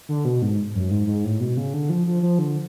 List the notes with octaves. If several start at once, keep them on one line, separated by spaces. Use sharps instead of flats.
D3
B2
G#2
F#2
G#2
G#2
A2
B2
C#3
D3
F3
F3
F3
D3